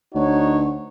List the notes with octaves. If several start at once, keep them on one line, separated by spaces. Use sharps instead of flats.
D2 D#4 F#4 C#5